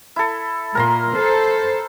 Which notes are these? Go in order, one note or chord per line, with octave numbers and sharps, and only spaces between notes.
E4 A4
A#2 A#4 A#5 C6
A4 C5